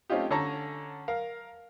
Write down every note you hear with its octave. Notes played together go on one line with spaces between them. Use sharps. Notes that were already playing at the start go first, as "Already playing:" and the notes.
A3 C4 C#4 D#4 F4 G4
D3 C#4 A4 A5 A#5 C#6
A#4 F5